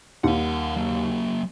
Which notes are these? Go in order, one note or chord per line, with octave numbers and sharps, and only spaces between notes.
D#2 A#4 F#5
F#3 A#3